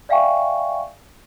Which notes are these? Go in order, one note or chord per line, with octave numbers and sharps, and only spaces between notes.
D5 E5 F5 G5 G#5 C#6